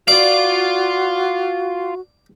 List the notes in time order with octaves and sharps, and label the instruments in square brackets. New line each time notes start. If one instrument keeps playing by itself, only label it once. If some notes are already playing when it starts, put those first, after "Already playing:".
[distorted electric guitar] F4 F5 [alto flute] F#4 [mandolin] D5 [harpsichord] D6